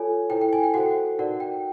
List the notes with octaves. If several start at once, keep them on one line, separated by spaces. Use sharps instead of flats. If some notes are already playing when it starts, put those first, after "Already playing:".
Already playing: F4 A4 C#5 G#5
E4 A4 C5 G5
G5
G#5
G5
F#4 A4 C5 F#5
D#4 F#4 A#4 D5 F#5
G5